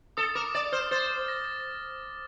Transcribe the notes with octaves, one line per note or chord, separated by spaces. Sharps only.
A4 D#6
A#4 D6
D5 D#6
C5 F6
C5 A6
A#6